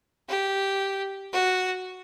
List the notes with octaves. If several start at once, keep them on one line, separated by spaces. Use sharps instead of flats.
G4
F#4